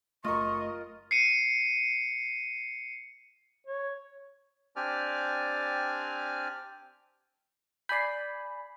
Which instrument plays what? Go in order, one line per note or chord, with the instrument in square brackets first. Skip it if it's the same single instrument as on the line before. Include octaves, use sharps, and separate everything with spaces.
[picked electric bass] F#1 A3 [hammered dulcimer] F4 A#4 [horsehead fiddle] D#5 [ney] C#6
[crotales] C7 C#7 D#7
[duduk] C#5
[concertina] C4 D4 G4 D5 G#5 F6
[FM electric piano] D5 G#5 B5 [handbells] G6 C7